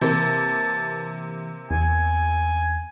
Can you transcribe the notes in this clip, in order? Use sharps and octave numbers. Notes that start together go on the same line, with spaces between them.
C3 E3 A#3 A5
E2 G#5